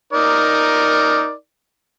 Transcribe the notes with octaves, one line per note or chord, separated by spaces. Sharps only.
D#4 A#4 D5